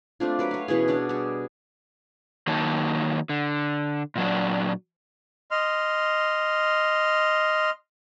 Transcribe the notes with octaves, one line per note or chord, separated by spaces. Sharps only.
A3 C4 D4 F4
F#3 B4 D6
C#5 F5
B2 E3 C#4 G#4
D4 C#5 D5 F#5
G3 G#4
D#3 F#3 A#3 D#4 C#5 A5
D3
A#2 F#3 D4
D#5 C6 F6